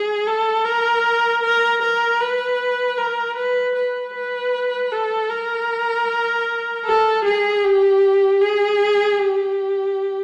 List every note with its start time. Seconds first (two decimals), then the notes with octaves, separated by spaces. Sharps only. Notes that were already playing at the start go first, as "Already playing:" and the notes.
Already playing: G#4
0.27 A4
0.65 A#4
1.44 A#4
1.82 A#4
2.20 B4
2.98 A#4
3.36 B4
3.75 B4
4.15 B4
4.92 A4
5.31 A#4
6.86 A4
7.25 G#4
7.64 G4
8.41 G#4
9.18 G4